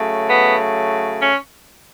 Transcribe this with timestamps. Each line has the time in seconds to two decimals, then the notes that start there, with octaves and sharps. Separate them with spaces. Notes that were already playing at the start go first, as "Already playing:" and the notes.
Already playing: C#3 F#3 A3
0.27 B3
1.21 C#4